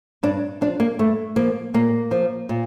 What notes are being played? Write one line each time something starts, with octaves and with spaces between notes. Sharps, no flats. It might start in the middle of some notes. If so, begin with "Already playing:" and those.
G2 D4
F3 D4
A#3
G2 A3
F3 A#3
A#2 A#3
F3
A#2